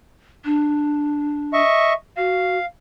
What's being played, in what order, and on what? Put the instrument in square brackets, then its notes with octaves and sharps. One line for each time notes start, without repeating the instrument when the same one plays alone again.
[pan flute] D4
[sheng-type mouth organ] D#5 E5 C#6
[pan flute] F#4 [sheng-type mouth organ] F5